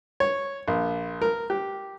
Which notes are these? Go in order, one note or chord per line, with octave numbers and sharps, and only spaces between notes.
C#5
A#1
A#4
G4